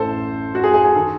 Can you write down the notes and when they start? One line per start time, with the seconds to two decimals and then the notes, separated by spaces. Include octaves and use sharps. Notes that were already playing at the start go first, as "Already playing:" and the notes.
Already playing: A1 A2 E3 A3 A4 C5
0.55 F#4
0.64 G#4
0.74 G#4
0.84 G#4
0.95 D#3 A4